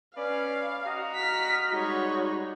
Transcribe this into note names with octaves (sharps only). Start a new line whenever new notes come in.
C#4 B4 D5 F5
F#4 D#5 A#5
F6 B6
G3 G#3 D#4 F#4 C#5